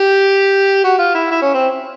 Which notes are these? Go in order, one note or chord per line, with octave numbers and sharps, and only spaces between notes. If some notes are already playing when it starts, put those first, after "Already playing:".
Already playing: G4
F#4
F4
E4
E4
C#4
C4